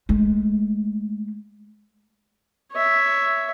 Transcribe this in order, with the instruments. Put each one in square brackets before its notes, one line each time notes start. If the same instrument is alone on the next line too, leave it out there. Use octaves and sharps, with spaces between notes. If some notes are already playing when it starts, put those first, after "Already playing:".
[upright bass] G#3 A3
[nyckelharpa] C#5 E5